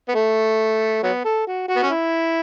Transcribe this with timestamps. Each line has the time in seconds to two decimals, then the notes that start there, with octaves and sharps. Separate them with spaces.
0.09 B3
0.15 A3
1.03 F#3 B3
1.25 A4
1.47 F#4
1.68 F#4
1.76 B3
1.83 C#4
1.90 E4